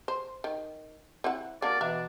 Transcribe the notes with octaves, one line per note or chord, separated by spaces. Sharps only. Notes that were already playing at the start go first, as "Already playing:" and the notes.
C5
D#3
C4 E4 F#5
A#3 D4 F#4 A#4 D5
B2 E3 D4 E5 F5 A#5